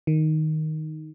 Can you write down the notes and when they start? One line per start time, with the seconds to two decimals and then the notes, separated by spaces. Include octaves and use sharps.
0.07 D#3